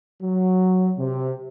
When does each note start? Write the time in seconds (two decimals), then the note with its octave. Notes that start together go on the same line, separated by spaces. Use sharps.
0.21 F#3
0.98 C3